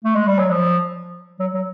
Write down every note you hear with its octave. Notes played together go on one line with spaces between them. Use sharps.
A3
G#3
G3
F#3
F3
F#3
F#3